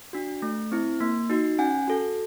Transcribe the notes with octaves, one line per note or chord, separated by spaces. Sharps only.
D4 F#4
A3
C4 E4
A#3
D#4 F#4
C#4 F#5 G#5
F#4 A4